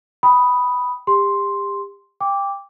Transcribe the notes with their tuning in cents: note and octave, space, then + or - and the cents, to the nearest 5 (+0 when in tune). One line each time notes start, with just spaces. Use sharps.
G5 +0 B5 +0 D#6 +0
G4 +30 C6 +0
G5 +25 D6 -10